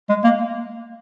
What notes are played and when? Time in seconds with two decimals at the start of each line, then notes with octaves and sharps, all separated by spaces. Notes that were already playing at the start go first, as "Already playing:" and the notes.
0.09 G#3
0.24 A#3